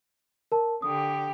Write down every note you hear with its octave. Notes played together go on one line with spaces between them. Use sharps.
A#4 A5
D3 G4 D#6